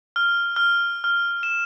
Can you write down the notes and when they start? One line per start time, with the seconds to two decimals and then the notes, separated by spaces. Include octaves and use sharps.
0.16 F6
0.56 F6
1.04 F6
1.43 E7